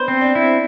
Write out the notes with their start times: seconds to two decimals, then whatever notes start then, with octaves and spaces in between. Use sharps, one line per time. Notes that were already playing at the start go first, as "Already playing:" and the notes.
Already playing: B3 D4 B4 C5
0.08 C4
0.21 D4 D5
0.35 E4